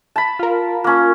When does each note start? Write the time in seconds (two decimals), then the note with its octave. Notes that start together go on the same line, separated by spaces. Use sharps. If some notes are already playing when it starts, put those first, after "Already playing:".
0.16 A5 B5
0.39 F4 A#4
0.84 A#3 C#4